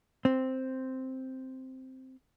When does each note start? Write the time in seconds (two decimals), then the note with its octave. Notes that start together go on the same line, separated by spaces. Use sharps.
0.25 C4